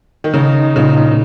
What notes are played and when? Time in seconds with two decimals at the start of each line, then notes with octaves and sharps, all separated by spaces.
0.24 D#3
0.34 C#3 D#4
0.76 A#2 C#3